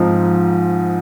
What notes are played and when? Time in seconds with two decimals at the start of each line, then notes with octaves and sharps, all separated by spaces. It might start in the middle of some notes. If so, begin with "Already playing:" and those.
Already playing: G#2 F3 C4 D#4